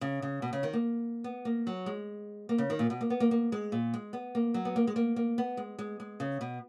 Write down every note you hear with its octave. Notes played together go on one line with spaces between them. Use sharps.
C#3
C#3
B2
C#3
D#3
A#3
B3
A#3
F#3
G#3
A#3
C#3
D#3
A#2
B2
A#3
B3
A#3
A#3
G#3
A#2
G#3
B3
A#3
F#3
B3
A#3
G#3
A#3
A#3
B3
G#3
G#3
G#3
C#3
B2